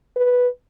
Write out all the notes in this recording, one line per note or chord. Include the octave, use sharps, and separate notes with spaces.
B4